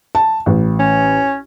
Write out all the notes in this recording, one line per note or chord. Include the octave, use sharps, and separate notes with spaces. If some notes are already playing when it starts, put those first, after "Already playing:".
A5
A1
C#4